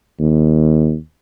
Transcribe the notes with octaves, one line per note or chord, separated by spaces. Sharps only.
D#2